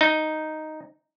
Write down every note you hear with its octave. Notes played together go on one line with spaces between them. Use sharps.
D#4